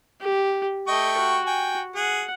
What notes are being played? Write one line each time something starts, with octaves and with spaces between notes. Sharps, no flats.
G4
A3 D#5 G5 C#6
F#4
G5 G#5
G#4 F#5